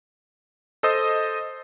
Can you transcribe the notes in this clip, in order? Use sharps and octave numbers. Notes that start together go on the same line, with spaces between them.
A4 C5 D#5 D#6